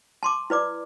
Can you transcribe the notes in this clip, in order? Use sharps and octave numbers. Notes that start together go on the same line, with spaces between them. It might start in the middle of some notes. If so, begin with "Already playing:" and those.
A5 C6 D6
E4 B4 D5 D6